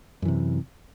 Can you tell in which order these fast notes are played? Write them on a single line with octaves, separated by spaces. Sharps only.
F#2 E3 C3